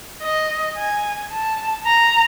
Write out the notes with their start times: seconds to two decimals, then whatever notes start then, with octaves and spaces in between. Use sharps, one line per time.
0.23 D#5
0.77 G#5
1.32 A5
1.86 A#5